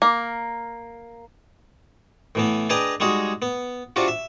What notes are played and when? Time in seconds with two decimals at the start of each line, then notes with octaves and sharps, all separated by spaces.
0.02 A#3
2.35 A2 E3 B3
2.70 D4 G#4 B4 D#5 G5 A#5
3.00 G3 G#3 D#4 F#4 G#4
3.42 B3
3.96 C3 D4 F4 F#4
4.08 E5